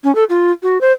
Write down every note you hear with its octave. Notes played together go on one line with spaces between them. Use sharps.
C#4
A4
F4
F#4
C5